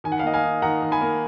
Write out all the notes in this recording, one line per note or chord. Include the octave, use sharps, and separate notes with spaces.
D#3 G#5
F#5
F5
A#3 D#5 F#5
F5 G#5
D#4
D#3 F#5 A#5
D#3
G#5 B5
A#3